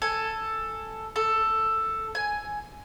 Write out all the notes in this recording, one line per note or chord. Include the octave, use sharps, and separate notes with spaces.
A4 G#5
A4
G#5